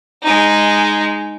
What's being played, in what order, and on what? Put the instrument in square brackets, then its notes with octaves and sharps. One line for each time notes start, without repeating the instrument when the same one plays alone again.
[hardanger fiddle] G#3 D#4